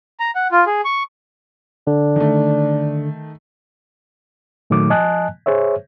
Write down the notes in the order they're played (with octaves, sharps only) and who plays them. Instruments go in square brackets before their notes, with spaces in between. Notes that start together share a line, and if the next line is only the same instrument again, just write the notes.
[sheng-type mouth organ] A#5
F#5
F4
G#4
C#6
[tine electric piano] D3 [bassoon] D4
[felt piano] D#3 A3
[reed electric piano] A#2 D#3 F#3 A3 D6
F3 D#5 G#5 A5 F#6
G#4 C5 C#5 E5